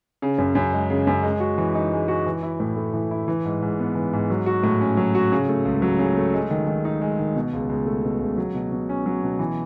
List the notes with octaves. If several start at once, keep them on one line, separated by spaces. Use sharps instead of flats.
C#3
F#2
F#2
G#3
C#3
F#2
G#3
F#4
E3
D#4
G#3
F#4
E3
E4
A2
A3
E3
E4
E3
G#2
G#2
B3
E3
G#2
F#3
F#4
A2
C#4
F#3
F#4
C#3
A3
C#2
F#3
C#3
A3
G#3
D#3
D#3
D#4
G#3
D#3
B2
C#2
C#2
A3
B2
C#2
F#3
B2
B2
C#4
F#3
B2
E3